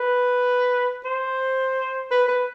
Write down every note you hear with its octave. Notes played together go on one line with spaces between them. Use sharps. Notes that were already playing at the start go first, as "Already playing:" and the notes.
Already playing: B4
C5
B4
B4